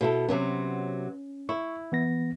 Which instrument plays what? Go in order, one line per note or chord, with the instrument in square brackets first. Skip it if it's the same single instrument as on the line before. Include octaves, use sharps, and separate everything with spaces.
[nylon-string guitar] B2 E4 A4
[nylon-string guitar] C3 F#3 B3 [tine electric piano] C#4
[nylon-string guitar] E4 [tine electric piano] C#6
[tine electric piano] E3 B3 A#6